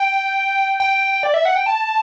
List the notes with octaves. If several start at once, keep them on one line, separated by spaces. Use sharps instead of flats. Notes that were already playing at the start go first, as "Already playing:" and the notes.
Already playing: G5
G5
D5
E5
F#5
G5
A5